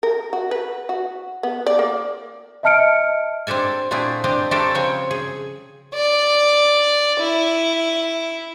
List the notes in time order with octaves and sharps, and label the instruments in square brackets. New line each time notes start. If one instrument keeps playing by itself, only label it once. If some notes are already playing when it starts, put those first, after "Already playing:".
[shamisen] A#4
F#4
B4
F#4
B3
D5
A#3
[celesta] D#5 E5 A5 F6 C#7 D7
[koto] C4 D4 G4 A4 G#5
A#2 A3 C4 D4 E4 G#4
C4 D4 G4 D#5
A3 C4 D4 G4 A4 A#4
C#3 F3 C4 C#5 G5 G#5
G#4
[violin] D5
E4